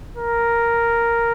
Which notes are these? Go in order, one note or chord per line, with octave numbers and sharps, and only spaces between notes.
A#4